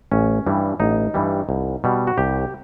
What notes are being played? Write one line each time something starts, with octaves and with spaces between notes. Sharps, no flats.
A1 C#4
G2 E3 G3
A1 D#4
G2 E3 G3
C2
B2 G3
F#4
C2 G4